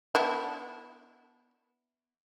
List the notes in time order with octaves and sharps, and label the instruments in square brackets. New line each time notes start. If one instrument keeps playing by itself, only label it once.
[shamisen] B3 D4 E4